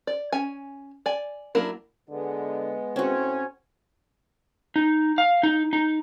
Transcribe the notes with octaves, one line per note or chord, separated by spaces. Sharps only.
D5
C#4 G#5
D5 G#5
F#3 A#3 D4 E4 A#4
D3 G#3 B3
A2 C4 C#4 F#4 G#5
D#4
F5
D#4
D#4